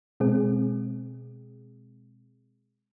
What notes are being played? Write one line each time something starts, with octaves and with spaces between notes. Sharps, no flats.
B2 G#3 C4 G#4